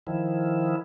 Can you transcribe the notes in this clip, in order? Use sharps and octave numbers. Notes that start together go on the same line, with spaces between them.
D#3 F3 E4